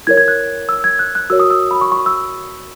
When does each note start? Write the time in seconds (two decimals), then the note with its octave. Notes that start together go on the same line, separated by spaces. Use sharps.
0.07 E4 A#4 C#5 G#6
0.18 G#6
0.28 F#6
0.69 E6
0.84 G#6
0.99 F#6
1.15 F#6
1.30 F#4 A#4 C#5 E6
1.40 D#6
1.51 E6
1.71 B5
1.81 C#6
1.92 C#6
2.06 E6